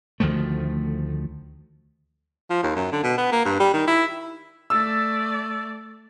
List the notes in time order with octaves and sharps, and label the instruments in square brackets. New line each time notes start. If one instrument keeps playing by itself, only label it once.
[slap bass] D2 D#3 F3 A3
[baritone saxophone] F3
D#2
F#2
D3
B2
B3
A#3
G2
G3
D#3
E4
[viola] A3 D5 [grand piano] E6